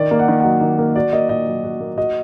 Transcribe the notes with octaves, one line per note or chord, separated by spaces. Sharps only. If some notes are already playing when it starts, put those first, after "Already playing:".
Already playing: D#3 D5
A#3
F#5
D#3
F#5
F#3 D#5
D#3
A#3
F#4 D5
A#3 D#5
A#2 D#5
F#3
F#4
A#3
F#4 D#5